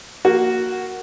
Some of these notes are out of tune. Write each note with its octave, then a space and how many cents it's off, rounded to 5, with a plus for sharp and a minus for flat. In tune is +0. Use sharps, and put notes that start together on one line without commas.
A#3 +0 F#4 +0